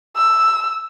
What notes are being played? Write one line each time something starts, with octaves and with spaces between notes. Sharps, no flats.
E6